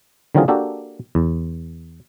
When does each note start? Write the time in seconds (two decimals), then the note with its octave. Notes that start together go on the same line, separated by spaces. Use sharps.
0.35 D3 D#3 F#3 C4 F4 G#4
0.48 A#3 D4 F#4 G4 A4
1.15 E2